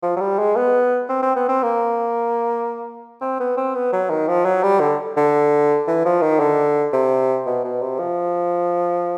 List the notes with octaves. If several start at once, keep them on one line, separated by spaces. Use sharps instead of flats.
F3
F#3
G3
G#3
B3
C4
C4
B3
C4
A#3
C4
B3
C4
B3
F#3
D#3
F3
F#3
G3
D3
D3
E3
F3
D#3
D3
C3
B2
B2
C3
F3